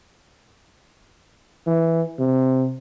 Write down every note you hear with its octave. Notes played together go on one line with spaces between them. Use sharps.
E3
C3